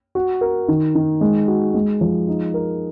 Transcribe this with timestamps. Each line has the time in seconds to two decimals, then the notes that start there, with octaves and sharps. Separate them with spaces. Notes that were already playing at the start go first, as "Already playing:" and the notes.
0.15 F#4
0.41 A#4
0.68 D#3
0.95 D#3
1.21 G#3
1.48 F#4
1.74 G#3
2.01 F3
2.28 D#4
2.54 A#4